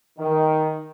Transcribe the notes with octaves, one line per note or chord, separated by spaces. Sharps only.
D#3